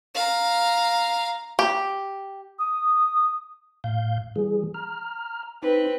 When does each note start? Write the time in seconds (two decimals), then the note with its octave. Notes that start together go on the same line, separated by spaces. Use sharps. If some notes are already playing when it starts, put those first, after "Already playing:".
0.15 F5 A#5
1.59 G4
2.59 D#6
3.84 A2 F5 G6
4.36 E3 G3 G#4
4.74 A#5 F6
5.63 C4 D#4 B4